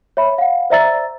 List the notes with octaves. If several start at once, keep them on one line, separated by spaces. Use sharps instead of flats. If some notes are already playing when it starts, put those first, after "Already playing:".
C#5 E5 B5
F5 F#5
C5 D5 E5 A#5 E6 A6